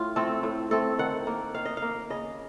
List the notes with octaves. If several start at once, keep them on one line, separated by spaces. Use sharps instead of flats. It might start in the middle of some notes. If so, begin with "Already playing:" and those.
Already playing: A2 F4
A3 C4 A4
A2
A3 C4 A4
D#3 F#5
A#3
D#3 F5
D#5
F5
A#3
C#3 D#5